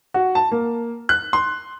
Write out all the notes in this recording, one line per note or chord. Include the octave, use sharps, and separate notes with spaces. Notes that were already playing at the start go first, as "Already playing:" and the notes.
F#4
A5
A#3
F#6
C6